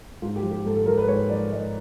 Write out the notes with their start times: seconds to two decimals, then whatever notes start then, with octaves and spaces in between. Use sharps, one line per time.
0.22 G#2 F4
0.36 G4
0.43 F3
0.51 G4
0.65 G#2 A4
0.76 A4
0.86 F3 A#4
0.97 B4
1.08 G#2 C#5
1.30 F3 D5
1.52 G#2 D#5